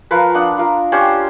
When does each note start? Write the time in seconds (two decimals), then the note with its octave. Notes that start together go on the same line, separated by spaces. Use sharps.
0.11 F3 A#4 B4
0.35 D4 F#5 D#6
0.58 F4 A#4
0.92 C#4 D4 G4 C5